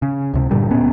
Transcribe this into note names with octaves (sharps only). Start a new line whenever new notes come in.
C#3
C#2 C3
G2 A#2 D3 G3
D1 A#2 B3 C#4